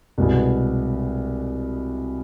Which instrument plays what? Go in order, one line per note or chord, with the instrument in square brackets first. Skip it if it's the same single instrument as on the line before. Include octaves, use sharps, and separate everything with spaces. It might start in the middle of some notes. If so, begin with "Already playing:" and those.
[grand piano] C2 B2 G#3 B3